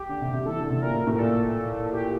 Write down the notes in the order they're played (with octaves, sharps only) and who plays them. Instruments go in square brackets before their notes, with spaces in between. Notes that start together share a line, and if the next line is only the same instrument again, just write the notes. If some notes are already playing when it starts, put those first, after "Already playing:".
Already playing: [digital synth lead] G4
[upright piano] D3
C3
C3
[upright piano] E3 [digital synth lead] A4
[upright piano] D3
[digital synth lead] A4
[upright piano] C3
[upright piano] A#2 [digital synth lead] A#4
[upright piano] A2
A2
[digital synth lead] A#4
[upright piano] A#2 [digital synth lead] A4
[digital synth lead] G4